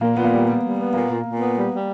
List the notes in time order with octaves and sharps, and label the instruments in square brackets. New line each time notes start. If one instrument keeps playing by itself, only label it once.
[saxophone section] A#2 [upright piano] A#3
[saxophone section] A#2 [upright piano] B3
[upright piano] A#3
[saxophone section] G3
G3
G3
B3
[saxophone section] A#2 [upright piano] A#3
[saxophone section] A#2
A#2
B3
G3
G3